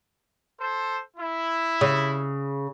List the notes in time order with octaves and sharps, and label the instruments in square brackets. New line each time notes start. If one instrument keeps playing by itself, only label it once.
[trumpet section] A4 C5
E4
[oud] C#3